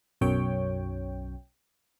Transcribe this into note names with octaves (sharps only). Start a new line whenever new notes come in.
B1 F#2 C#5 G5